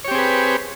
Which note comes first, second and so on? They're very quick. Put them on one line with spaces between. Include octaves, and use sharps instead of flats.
C#5 G4 C4 G#4 B4